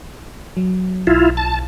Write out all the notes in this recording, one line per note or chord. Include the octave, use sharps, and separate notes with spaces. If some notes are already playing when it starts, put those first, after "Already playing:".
F#3
B1 E4 F4
A5